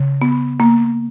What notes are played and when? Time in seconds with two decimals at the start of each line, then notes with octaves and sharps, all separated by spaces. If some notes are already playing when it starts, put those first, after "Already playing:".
Already playing: C#3
0.22 B3
0.60 A#3